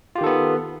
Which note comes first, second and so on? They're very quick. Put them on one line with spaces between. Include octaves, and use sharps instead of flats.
F4 G4 D#3 A4 B3